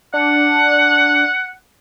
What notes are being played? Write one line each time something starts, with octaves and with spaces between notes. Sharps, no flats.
D4 F#5